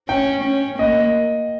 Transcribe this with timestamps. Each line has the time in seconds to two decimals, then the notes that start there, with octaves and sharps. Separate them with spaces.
0.09 C#4 G5
0.44 C#4
0.79 A#3 D#5